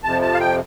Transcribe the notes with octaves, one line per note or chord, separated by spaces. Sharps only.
F2 C3 F3 A5
A5
F5
G5